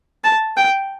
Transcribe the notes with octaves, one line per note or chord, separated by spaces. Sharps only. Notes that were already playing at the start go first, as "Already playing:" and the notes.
A5
G5